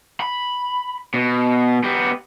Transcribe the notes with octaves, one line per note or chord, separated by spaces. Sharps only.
B5
B2
B3 G4